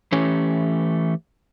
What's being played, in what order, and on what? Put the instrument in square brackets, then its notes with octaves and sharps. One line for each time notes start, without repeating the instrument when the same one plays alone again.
[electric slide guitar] E3 A3 C#4 G4